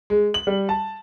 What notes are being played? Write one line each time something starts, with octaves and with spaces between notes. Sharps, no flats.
G#3
F#7
G3
A5